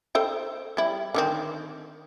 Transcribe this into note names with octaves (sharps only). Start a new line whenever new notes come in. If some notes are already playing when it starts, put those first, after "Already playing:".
A4 C5 G5
G3 E4
D3 D#3 C4